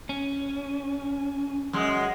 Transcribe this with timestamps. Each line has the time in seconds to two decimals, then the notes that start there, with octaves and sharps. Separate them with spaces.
0.09 C#4
1.73 F#2 G#3